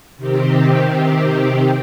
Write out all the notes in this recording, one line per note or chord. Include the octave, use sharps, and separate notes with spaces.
C3 D#3 C4 G4